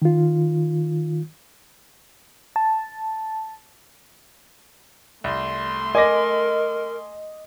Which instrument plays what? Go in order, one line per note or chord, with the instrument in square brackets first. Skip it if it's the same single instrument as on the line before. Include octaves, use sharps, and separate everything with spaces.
[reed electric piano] D#3 F4
[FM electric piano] A5
[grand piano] C2 [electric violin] A3 C6
[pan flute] A#4 [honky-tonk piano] D#5 [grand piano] G#5 D6 A#6